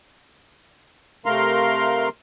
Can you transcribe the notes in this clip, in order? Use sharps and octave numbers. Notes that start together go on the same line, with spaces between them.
C3 A3 A#4 F5 A#5 C6